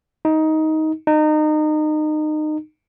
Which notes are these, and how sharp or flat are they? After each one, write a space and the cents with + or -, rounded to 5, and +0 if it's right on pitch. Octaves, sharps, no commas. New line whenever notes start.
D#4 +15
D#4 -25